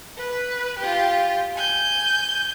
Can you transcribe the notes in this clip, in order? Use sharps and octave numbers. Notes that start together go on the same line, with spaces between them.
B4
F4 G4
G#5 G6